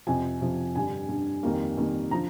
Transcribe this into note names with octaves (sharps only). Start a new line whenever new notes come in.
F2 C3 F3 G#5
F2 C3 F3
G2 D3 G3 G#5
G2 D3 G3
F2 D#3 G3 A#3
F2 D#3 G3 A#3
D3 F3 A#5